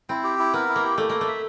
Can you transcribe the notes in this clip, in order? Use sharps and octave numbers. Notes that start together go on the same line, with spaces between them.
C4 E4
G4
E4
B3 A#4
E4
A#3
G4
A3 E4
A#3 A4
A3
E5